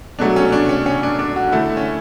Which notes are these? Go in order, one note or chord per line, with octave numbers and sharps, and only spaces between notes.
B2 F#3 A3 D4
C#4
D4
C#4
C#4
D4
D4
F#4
D3 A3 E4
C#4